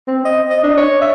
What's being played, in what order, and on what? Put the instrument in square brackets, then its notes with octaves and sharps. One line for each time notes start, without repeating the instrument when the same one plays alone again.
[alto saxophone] C4
D#5
D#5
D4
C#5
E5